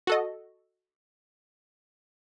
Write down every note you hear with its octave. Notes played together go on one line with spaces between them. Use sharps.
F#4 A4 D#5